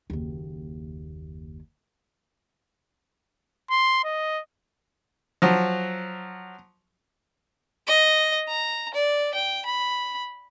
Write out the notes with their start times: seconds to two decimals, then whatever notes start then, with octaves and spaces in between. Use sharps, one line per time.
0.10 F#1 D#2
3.71 C6
4.05 D#5
5.42 F3 F#3
7.87 D#5
8.48 A#5
8.94 D5
9.34 G5
9.66 B5